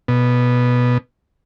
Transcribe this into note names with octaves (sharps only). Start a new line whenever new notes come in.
B2